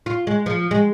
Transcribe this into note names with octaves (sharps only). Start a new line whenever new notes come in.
F4
G#3
F3
G#3